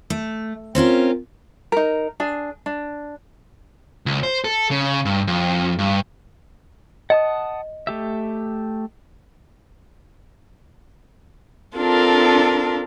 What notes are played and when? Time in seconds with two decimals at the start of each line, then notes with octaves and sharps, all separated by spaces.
0.10 A3
0.75 C4 C#4 F4 A#4
1.72 D#4 A#4
2.20 D4 G#4
2.66 D4
4.06 C#2
4.23 C5
4.44 A4
4.71 C#3
5.05 G2
5.27 F2
5.78 G2
7.10 D#5 F#5 A5 D#6
7.87 A3 G4 E5
11.76 C4 D4 F4 A4 A#4